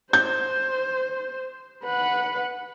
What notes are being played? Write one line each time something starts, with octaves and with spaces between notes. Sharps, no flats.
C5 G6
B4 F#5